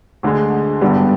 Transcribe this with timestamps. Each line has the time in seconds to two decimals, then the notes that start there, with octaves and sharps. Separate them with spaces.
0.23 D2 D3 G#3
0.81 G#1 G2 D3 G3 B3